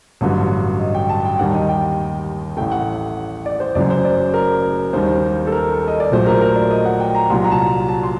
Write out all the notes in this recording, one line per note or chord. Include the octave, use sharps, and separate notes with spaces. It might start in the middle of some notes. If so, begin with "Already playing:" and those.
A1 G2 D3 F#3
D#5
G5
A5
G5
D#2 D#3 G3 F#5
D#5
G5
A1 A2 A3 G5
F#5
D5
C5
F#1 F#2 F#3 D5
C5
D5
A#4
D#2 D#3 G3 C5
A4
A#4
D#5
D5
A#1 A#2 F#3 A3 C5
A#4
A#4
D5
D#5
F#5
G5
A#5
C2 A#2 F#3 C6
A#5
A5
A#5
A5
C6